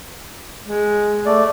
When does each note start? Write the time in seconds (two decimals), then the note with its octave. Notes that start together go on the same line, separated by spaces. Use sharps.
0.66 G#3
1.26 A3 D5